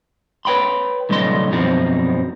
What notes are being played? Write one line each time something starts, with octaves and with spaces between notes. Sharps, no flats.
B4 C#5 G5 B5 C6
C2 A2 D3 F#3 D#5 C6
F#2 B2 F3 C4 D#4